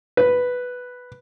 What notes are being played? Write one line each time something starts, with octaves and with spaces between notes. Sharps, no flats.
B4